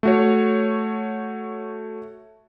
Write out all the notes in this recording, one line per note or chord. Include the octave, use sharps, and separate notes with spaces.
A3 F#4 C#5